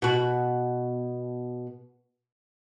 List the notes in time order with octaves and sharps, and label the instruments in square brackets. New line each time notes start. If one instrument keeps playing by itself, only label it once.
[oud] B2 F#4